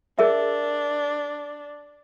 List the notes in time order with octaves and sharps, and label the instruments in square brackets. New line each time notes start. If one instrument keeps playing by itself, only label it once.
[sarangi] D4 [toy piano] G#4 A#4 E5